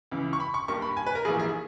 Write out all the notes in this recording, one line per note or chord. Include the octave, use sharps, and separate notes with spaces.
C#2 C#3 E3
C#6
B5
C#6
G2 G3 A#3 C#6
B5
G#5
B4
A#4
A#1 G#2 E3 A#3 G#4
G#4